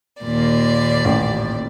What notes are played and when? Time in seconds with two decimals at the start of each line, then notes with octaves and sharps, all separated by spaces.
0.22 D#2 A#2 D5
1.05 A1